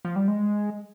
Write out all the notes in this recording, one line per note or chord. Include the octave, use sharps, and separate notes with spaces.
F3
G3
G#3